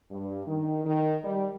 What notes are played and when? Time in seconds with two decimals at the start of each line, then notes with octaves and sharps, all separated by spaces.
0.11 G2
0.48 D#3
0.85 D#3
1.24 G3